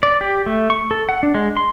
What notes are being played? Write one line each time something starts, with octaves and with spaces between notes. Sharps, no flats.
D5
G4
A3
C#6
A4
F#5
D4
G#3
C6